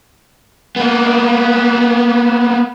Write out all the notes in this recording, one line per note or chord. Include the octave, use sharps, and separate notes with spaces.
A#3 B3